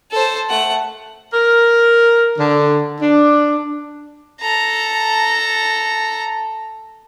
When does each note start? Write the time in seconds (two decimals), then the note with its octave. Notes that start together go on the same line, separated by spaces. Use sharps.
0.11 A4 C5
0.50 A3 F#5
1.33 A#4
2.38 D3
3.00 D4
4.42 A4 A#5